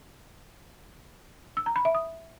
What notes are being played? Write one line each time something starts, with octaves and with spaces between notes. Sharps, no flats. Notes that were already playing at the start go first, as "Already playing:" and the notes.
E6
A#5
B5
E5
D#6